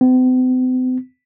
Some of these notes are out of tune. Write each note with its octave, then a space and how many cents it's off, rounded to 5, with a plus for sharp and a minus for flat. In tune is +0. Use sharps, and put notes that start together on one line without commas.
C4 -45